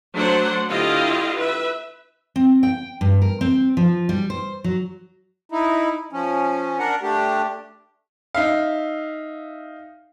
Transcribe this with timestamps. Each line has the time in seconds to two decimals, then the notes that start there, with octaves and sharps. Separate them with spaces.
0.14 F#3 A3 D4 C5 F#5
0.69 D3 E4 F4 G4 D#5 F5
1.36 B4 E5
2.36 C4
2.63 G5
3.01 G2
3.22 A#4
3.41 C4
3.77 F3
4.09 G3
4.30 C5
4.64 F#3
5.52 D#4 E4
6.13 F3 C#4
6.79 D4 A#4 F#5
7.02 A3 D4 G4
8.35 D#4 E5 F5